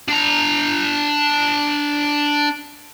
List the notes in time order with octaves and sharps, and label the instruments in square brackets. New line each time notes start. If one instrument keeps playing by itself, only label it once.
[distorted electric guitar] D4 A#5